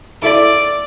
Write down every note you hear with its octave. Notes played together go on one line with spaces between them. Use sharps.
E4 A4 D5 E5